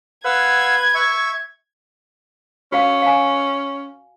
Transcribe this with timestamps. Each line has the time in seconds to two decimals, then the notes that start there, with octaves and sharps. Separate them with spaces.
0.25 B4 F5 F#5 E6 G#6
0.94 E5 C#6
2.72 C#4 F#4 F5
3.02 F5 G#5